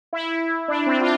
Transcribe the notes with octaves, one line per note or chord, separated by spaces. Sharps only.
E4
D4
C4
F4